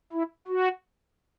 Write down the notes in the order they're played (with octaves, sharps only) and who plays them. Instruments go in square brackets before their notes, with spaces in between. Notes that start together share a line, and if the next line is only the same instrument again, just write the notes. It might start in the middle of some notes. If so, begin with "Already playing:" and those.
[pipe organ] E4
F#4